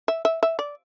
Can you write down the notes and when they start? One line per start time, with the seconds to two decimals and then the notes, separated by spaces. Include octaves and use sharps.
0.08 E5
0.25 E5
0.43 E5
0.59 D5